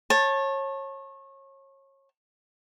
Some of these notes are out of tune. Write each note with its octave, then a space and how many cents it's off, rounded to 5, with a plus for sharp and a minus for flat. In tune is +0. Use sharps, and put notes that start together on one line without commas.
C#5 -30 A5 +0